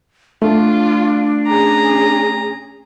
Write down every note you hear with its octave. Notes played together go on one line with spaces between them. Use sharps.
A3 D4 F4
C#4 G#4 A#5